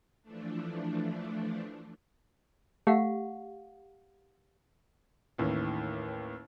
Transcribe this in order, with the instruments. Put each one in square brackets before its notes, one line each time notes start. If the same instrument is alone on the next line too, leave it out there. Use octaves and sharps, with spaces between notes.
[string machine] E3 F3 A3 D4
[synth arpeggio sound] A3 [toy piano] G4 F5 F#5
[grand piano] A1 D#2 A2